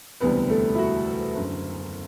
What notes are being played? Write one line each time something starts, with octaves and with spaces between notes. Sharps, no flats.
E1 D2 C3 E3 G3 B3 B4
A3 A4
E4
F#4
F#1 F#2 D3